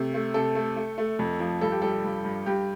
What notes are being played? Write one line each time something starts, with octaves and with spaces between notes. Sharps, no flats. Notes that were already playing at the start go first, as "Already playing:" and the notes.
Already playing: C3 A3
A3
C3 A4
A3
A3
A3
F2
F3
G2 A4
G4
G3 A4
G2
G2
G2 G4